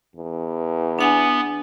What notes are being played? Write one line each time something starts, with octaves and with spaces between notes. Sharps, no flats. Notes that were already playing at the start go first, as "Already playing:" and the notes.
E2
B3 D4 F#5 G#5